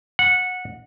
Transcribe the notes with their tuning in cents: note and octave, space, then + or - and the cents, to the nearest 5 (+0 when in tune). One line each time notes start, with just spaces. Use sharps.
F#5 -15